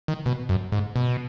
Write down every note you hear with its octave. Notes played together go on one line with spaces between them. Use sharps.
D#3
B2
F#2
G#2
B2